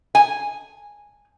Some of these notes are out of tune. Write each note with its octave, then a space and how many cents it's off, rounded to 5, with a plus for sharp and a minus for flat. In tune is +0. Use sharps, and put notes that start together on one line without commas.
G#5 -10